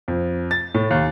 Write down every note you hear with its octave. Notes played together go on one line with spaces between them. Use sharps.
F2
A6
A2
D#2